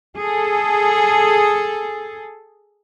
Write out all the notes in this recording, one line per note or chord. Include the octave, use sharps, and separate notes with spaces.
G#4 A4